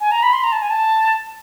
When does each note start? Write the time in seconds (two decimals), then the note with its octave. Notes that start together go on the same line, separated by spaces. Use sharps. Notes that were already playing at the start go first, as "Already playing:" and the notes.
0.01 G#5
0.12 A#5
0.23 B5
0.33 C6
0.44 A#5
0.52 A5
0.62 G#5
0.70 A5